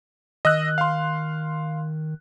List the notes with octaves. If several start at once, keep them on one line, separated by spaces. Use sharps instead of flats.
D#3 D#5 E6 F#6
F5 C6